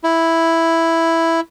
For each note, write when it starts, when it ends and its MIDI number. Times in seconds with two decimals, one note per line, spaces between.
0.04 1.40 64